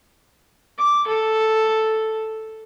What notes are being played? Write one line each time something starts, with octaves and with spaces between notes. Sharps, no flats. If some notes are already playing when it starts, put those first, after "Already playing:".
D6
A4